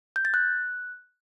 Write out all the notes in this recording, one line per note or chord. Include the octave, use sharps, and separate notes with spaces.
G6
A6
F#6